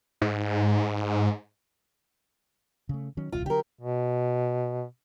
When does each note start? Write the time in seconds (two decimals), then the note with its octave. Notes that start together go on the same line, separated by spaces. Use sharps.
0.22 G#2
2.89 C#3 A3
3.17 D#3 F#3 C#4
3.32 D#1 C2 F4
3.46 D3 F#3 G4 A#4
3.81 B2